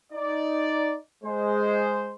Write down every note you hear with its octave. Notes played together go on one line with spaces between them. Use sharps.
D#4 D5
G#3 C5